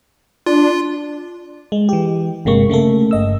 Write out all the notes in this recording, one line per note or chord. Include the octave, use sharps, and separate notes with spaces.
D4 F4
G#3
E3 G4
G1 C3 G#3 A#3 C#6
C#3 A3 A#3 A4
G1 D#5 E6